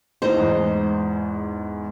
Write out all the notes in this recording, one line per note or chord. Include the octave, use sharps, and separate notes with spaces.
A2 D#4 C5
E2 G#2